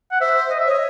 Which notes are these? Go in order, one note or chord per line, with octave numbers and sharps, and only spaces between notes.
F#5
C5 E5
D#5
E5
C#5 D#5